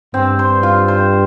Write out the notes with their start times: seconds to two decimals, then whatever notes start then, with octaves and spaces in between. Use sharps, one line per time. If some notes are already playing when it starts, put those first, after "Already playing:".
0.14 G2 C4
0.39 C5
0.63 F4
0.88 C5